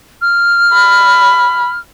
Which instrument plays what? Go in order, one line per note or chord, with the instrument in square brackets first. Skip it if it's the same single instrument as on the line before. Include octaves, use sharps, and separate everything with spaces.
[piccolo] F6
[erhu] B5